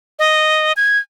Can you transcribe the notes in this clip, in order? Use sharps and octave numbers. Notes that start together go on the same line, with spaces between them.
D#5
G#6